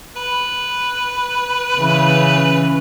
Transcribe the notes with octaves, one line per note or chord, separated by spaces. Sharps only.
B4
C#3 E3